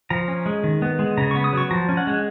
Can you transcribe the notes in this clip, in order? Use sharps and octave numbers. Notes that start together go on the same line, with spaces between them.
F3 A#5
C#4
G#3
D#3
B3
G#3
C#3 A#5
B3 C#6
D#6
F#3 C#6
F3 A#5
C#4
F#5
G#3